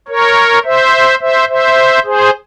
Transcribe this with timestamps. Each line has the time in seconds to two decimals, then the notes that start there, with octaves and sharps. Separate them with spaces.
0.08 A#4 C#5
0.64 C5 E5
1.21 C5 E5
1.49 C5 E5
2.05 G#4 C5